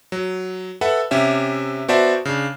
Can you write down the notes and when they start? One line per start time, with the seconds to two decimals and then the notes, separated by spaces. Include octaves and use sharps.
0.12 F#3
0.81 A4 B4 E5 F#5
1.11 C3 C#4 G4 E5
1.88 B3 F#4 C5 D5 E5 A5
2.25 C#3 D4